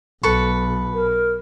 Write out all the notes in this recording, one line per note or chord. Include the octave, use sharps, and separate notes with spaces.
B1 A4 B4 C#6
A#4